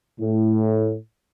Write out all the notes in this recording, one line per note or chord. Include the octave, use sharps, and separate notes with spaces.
A2